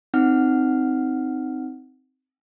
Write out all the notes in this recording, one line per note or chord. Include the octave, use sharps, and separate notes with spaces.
C4 D#4 F#5 F6